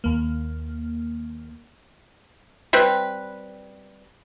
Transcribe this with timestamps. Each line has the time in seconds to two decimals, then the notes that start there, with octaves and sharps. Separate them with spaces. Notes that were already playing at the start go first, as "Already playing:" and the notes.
0.04 D#2 A#3
2.73 G3 C4 B4